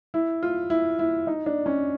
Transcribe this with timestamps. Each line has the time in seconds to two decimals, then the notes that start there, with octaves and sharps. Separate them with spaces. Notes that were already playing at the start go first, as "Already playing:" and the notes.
0.14 E4
0.43 F4
0.70 E4
0.99 E4
1.27 D#4
1.46 D4
1.66 C#4